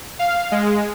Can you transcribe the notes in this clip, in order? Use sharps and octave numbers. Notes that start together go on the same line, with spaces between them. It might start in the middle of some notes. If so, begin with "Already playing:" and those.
F5
G#3